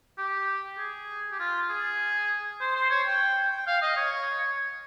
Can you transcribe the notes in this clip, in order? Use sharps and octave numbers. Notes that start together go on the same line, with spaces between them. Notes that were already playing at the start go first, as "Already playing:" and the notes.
G4
G#4
G4
F4
G#4
C5
C5
C#5
G5
G5
F5
D#5
C#5